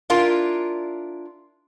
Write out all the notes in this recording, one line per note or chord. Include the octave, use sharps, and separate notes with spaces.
D4 E4 F4 A#4